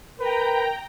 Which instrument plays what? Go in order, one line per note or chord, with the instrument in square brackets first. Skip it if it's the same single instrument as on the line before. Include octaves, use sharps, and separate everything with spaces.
[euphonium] A#4 [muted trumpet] B4 [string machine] G5 A#5